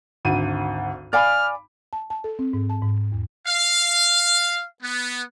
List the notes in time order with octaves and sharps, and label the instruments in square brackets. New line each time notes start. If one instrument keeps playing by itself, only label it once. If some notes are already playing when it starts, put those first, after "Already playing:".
[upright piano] G#1 D2 D#7
[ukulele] D5 F5 G#5 [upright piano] B5 D6 [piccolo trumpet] F6
[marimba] A5
A5
A4
C4
G#2
A5
G#2
E2
[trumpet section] F5
B3